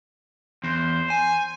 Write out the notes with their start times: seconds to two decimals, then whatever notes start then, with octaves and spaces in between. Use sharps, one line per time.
0.64 E2 C5
1.10 G#5